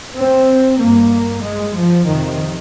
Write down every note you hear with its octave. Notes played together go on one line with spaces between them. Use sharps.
C4
G2 A#3
G#3
F3
F2 C3 D#3